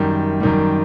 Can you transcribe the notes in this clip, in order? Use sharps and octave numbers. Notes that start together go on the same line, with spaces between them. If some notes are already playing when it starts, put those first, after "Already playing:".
Already playing: F#2 D#3 G3
F#2 D#3 G3